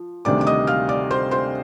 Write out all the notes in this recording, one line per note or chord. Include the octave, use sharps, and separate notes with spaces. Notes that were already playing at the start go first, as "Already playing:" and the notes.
Already playing: F3
D2 C3 D#3 G3 D5 D6
D6
D#5 D#6
F5 F6
D5 D6
C5 C6
C5 C6